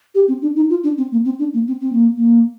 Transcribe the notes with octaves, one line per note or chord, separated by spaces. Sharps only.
G4
C4
D4
D#4
F4
D4
C4
A#3
C4
D4
A#3
C4
C4
A#3
A#3